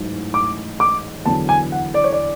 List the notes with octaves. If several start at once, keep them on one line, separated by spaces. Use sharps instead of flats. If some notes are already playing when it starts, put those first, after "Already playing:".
Already playing: A1 G#2 F#3
D6
D6
E2 D3 F#3 A5
G#5
F#5
D5
C#5
D5